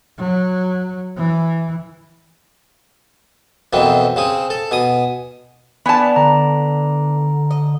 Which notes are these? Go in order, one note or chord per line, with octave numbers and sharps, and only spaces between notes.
F#3
E3
F2 B2 D#3 E3 C4
C#3 C4 G#4
A4
B2 G#5 D#6
B3 D4 E4 G#5 A5
D3 A#5
D#5